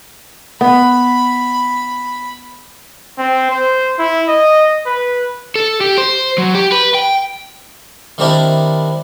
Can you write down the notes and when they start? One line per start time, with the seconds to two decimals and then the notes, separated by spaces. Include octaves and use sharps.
0.61 B3 B5
3.18 C4
3.51 C5
3.99 E4
4.29 D#5
4.86 B4
5.55 A4
5.81 G4
5.98 C5
6.38 F#3
6.55 G4
6.72 B4
6.95 G5
8.18 D#3 G3 C4 D4 E4 A#4